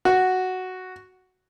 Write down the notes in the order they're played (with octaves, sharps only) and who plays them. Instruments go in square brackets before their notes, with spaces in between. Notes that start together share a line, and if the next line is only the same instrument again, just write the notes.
[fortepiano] F#4